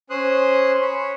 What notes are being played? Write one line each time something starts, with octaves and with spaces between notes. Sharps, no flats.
C#4 C5 C6 D#6 F#6
C#5 B5